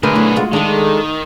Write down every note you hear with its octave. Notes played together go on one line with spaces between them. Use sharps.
B1 D3 A3 G#4 A#4 B4
F#3 E4
G#3 F4 F#4
D#3 G#3 D4 A4